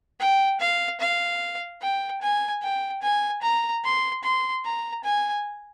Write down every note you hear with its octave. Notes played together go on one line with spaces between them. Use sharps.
G5
F5
F5
G5
G#5
G5
G#5
A#5
C6
C6
A#5
G#5